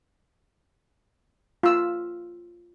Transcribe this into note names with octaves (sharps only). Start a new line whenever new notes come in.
F4 E6